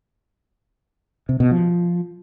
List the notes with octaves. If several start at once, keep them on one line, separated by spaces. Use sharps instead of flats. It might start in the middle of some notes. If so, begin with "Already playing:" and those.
C3
B2
F3